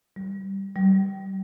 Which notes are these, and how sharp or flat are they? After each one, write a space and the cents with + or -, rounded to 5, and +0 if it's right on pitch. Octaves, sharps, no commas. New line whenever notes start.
G3 -10
G3 -30